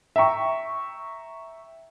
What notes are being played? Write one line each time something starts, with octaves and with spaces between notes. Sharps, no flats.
E5 G5 A#5 C#6